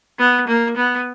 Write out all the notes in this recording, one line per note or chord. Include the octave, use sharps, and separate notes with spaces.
B3
A#3
B3